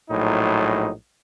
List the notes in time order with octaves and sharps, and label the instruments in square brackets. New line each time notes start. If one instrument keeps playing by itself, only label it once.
[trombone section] A#1 A2 F#3 D#4